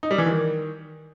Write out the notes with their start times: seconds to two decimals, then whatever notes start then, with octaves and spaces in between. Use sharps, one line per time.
0.03 D#4
0.11 G3
0.18 E3
0.26 D#3